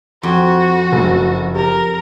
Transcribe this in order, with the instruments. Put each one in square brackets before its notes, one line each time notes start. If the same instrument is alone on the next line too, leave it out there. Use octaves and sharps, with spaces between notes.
[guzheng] F2 [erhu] F#4
[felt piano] F#1 F#3
[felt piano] G4 [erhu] A#4